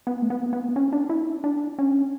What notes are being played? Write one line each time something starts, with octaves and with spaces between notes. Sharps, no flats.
B3
A3
B3
B3
C#4
D4
E4
D4
C#4